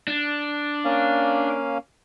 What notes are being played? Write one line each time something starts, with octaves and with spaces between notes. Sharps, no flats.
D4
A#3 C#4 F5